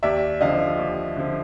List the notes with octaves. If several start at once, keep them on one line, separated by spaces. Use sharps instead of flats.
D#2 D5 E5
D3 F3 D#5 F5
D#2
D3 F3